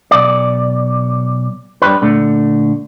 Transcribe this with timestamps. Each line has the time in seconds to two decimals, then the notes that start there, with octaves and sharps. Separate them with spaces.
0.11 B1 D5
1.82 G2 G3 B4
2.02 A#2 D3 A3